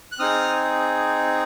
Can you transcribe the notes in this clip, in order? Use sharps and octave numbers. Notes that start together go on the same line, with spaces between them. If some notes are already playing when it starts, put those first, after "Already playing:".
F#6
C4 D#4 G#4 D#6 F6